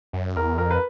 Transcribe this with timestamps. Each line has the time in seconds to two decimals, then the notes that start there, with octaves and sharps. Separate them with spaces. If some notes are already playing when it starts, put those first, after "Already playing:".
0.13 F#2
0.36 E2 A#4
0.58 F2 A#4
0.71 B4